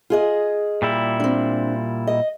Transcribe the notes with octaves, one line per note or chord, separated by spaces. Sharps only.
F4 G#4 D#5
A#2 G3 E4
C4 D4
D#5